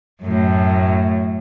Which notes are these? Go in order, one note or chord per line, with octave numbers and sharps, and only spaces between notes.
F#2 A2